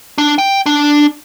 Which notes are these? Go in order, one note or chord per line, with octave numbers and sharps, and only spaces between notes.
D4
G5
D4